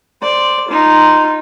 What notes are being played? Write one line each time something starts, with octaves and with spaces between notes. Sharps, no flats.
C5 D5
D#4 F4